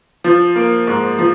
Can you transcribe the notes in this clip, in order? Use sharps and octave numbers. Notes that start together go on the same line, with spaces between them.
F3
A#3
G#2
F3